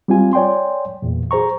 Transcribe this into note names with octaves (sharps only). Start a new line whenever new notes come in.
G3 C4 F4 G#5
C#5 D5 G5 G#5 C6
E2 A#2
G#4 C5 A#5 C#6